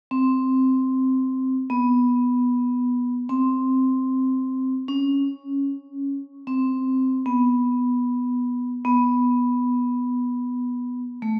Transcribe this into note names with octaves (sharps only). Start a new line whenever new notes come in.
C4
B3
C4
C#4
C4
B3
B3
A3